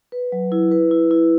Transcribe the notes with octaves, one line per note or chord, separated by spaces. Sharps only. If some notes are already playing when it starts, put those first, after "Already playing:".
B4
F#3
E4
B4
E4
E4